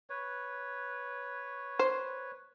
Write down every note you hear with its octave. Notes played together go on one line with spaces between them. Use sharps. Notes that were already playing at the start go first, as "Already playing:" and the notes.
B4 C#5
C5